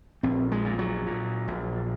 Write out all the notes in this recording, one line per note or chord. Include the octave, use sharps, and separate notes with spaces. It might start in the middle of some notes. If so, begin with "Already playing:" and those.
A#1 C4
G#3
A#2
F#3
A#2
A#1